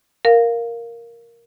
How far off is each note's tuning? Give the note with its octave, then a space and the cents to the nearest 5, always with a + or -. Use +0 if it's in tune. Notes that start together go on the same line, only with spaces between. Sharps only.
A#4 +0 F5 +0